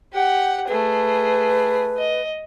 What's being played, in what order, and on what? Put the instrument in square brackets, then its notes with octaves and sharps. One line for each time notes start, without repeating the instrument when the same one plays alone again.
[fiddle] G4 F#5
[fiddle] A3 G#4 [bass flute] B4
[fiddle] D#5